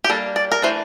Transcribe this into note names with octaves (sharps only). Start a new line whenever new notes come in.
G4
G3 A#3 D4 A4
D5
A#4
E3 A3 D4 C5